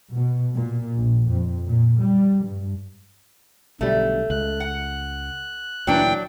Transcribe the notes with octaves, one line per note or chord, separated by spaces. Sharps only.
B2
A#2
A#1
F2
A#2
G3
G2
B1 B2 D3 G3 A3
C#2 F#6
F#5
D2 A#2 E3 F#3 D4 G5